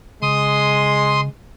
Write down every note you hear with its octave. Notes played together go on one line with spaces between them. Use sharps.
C#3 G#3 C6 D#6